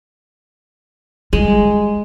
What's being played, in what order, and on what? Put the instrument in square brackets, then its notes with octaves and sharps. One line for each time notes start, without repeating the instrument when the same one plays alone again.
[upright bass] G3 [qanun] G#3